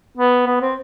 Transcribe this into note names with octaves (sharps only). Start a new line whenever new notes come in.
B3
B3
C4